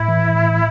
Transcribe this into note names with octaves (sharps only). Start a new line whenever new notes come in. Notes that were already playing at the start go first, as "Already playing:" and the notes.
Already playing: A2 E4
E3
A2